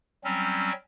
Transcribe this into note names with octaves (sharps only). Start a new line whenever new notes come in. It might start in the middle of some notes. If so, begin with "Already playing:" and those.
F#3 G3 C4 C#4